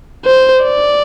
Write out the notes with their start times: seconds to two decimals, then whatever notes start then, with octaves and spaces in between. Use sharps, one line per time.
0.25 C5
0.64 D5